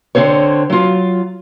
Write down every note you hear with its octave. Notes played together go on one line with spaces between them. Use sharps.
D3 C4 C5 C#5
F#3 F4